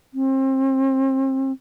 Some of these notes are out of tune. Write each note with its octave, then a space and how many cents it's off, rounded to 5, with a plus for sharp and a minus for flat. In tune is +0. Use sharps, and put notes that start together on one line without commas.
C4 +35